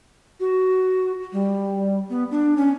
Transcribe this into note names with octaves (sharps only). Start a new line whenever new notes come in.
F#4
G3
B3
D4
C#4